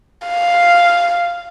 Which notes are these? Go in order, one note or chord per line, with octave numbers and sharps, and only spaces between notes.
F5